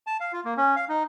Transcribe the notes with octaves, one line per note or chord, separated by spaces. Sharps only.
A5
F5
F4
A#3
C#4
F5
D#4